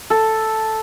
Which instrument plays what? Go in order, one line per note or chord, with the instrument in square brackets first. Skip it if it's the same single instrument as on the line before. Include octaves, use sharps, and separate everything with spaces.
[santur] A4